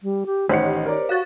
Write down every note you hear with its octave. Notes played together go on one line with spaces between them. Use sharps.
G3
G4
A1 D#3 G4 C5 C#5 F#5 C#7
A#4 D5
F#4 F5 F#6 A6